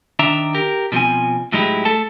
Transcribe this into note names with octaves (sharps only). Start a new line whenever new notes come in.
D#3 D4 E5 A#5
G4 A#4
B2 E3 F3 C4 G#5
A2 F#3 G#3 D#4 E4 G4
A3 A4 A5